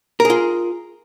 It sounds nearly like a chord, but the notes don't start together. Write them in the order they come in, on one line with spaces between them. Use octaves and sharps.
A#4 G#4 F4